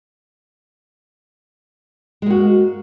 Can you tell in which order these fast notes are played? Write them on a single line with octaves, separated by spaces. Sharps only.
G#3 A#3 F#4